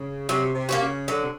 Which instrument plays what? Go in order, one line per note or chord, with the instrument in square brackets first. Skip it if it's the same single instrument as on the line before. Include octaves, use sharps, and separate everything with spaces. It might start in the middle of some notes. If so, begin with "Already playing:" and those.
Already playing: [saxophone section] C#3
[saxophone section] C3 [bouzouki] F#3
[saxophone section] C3
[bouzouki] A#3 C#4 F#4
[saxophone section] C#3
[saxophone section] D3 [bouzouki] F#3
[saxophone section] C3